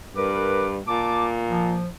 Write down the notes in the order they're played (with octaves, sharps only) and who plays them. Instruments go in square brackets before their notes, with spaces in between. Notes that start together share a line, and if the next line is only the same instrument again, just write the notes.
[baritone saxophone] G2 [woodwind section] A#4 B4 D6
[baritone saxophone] A#2 [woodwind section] A5 D6
[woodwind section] F3